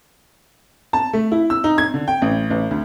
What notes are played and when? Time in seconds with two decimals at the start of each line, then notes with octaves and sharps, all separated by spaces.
0.93 A5
1.13 A3
1.32 E4
1.50 E6
1.64 D#4
1.78 G#6
1.94 D3
2.08 G5
2.22 A1
2.50 A1
2.71 D2